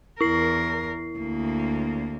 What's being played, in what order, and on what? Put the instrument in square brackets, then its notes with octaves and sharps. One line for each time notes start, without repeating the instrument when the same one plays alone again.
[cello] E2 A#4 [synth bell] E4 C7
[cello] D2 A#3